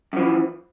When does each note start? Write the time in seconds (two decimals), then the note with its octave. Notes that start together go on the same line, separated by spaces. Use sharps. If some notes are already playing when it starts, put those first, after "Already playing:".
0.13 F#2
0.16 F3
0.20 E3